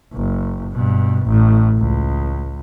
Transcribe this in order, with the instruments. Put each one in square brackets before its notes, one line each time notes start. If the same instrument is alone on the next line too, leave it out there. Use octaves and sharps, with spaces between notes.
[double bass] F#1
G2 B2
A1 A2
C#2